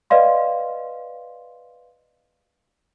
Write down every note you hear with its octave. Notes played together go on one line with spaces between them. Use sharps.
B4 D5 D#5 F5 C6